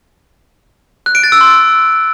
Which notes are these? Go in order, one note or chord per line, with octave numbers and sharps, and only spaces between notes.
F#6
D7
A6
E6
C6